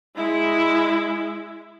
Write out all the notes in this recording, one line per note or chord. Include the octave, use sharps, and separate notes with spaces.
G#3 E4